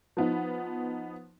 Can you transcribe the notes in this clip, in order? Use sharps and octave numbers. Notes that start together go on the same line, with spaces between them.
F3 B3 D#4